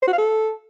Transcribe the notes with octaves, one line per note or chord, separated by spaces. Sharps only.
C5
F#4
F5
A4